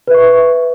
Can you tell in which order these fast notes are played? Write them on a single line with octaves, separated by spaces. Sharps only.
B4 E5 C#6